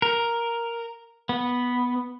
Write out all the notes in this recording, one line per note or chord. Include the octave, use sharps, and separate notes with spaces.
A#4
B3